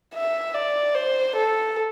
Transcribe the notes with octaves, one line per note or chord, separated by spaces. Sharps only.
E5
D5
C5
A4